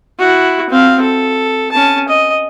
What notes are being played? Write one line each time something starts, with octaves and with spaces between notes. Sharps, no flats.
E4 F#4
C4 F5
A4
C#4 A5
D#5